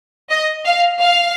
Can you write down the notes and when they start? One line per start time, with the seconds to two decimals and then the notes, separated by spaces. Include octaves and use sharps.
0.30 D#5
0.65 F5
1.01 F5